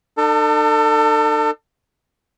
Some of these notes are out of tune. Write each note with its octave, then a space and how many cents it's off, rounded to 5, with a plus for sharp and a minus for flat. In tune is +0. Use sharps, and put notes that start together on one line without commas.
D#4 -45 A4 +30